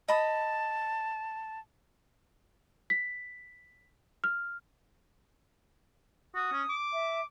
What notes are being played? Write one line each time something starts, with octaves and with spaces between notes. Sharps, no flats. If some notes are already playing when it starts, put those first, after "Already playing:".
D#5 A5 B5 D#6
B6
F6
F#4 D#6
C#4
D6
E5